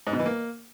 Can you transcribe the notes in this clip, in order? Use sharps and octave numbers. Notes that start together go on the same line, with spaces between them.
G#2
B2
E3
A#3